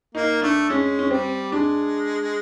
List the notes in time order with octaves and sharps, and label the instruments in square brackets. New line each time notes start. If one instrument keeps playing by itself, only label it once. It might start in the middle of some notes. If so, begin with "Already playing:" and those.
[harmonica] A#3 [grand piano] D#4
[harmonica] A3 [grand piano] D4
[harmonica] G#3 [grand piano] C#4
[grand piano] C#4
[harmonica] G3 [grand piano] C4
[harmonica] G#3 [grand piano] D4